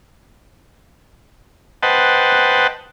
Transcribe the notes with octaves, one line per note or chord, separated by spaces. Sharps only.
B4 C5 D#5 F#5 G5 A5